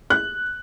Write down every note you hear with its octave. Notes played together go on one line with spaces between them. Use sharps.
F#6